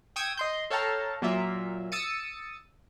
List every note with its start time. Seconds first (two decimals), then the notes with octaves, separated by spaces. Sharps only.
0.16 G5 C#6 D#6 E6 G#6
0.37 D#5 C6 G6
0.70 A4 C#5 F5 G5 A5 A#5
1.22 A#2 F#3 A#3 F4 E5
1.92 D#6 E6 A6 C#7 D#7